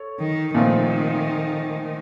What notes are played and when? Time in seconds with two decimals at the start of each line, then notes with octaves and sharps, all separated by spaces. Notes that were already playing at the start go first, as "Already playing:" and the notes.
Already playing: A4 C#5
0.20 D#3
0.54 A#2 D#3 F3 A3 C4